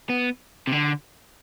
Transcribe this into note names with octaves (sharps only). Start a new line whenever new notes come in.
B3
C3
D3